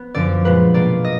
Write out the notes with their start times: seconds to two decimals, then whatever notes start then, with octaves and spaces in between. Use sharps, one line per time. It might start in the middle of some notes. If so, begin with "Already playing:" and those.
Already playing: B3
0.14 F#2 D3 F3 D5
0.45 A#2 G#3 B3 F4 B4
0.74 B2 A#3 F4 D5
1.04 D#5